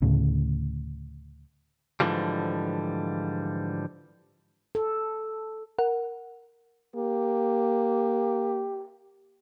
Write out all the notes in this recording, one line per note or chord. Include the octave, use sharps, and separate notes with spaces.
D2 A2 C#3
G#2 B2 D3 E3 F3 G3
A4
A#4 F#5
A#3 G4